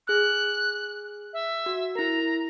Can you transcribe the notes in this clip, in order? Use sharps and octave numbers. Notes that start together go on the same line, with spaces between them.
G#4 F6 F#6
E5
F#4
E4 A#4 A#5